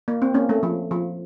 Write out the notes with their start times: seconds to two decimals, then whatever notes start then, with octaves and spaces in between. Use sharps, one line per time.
0.08 A#3
0.22 C4
0.34 A#3 C#4
0.49 A3
0.63 F3
0.91 F3